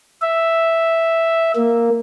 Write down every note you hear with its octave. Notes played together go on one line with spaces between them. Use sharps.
E5
A#3